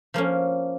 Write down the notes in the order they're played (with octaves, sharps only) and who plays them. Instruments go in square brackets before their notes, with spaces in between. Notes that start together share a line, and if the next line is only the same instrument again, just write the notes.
[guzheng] F3 A#3 C#4